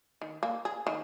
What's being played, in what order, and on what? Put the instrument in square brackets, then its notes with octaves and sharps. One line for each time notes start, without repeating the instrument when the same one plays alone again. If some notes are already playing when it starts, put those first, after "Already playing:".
[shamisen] D#3
A#3
G#4
D#3